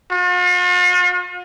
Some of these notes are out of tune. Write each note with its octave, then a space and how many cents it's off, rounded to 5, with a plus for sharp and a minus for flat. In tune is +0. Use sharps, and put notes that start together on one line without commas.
F4 +45